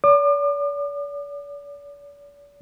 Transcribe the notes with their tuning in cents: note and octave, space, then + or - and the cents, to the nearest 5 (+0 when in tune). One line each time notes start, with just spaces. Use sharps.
D5 -45 D6 +40